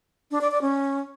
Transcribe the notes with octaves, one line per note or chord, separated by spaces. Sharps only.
D4
D5
D5
C#4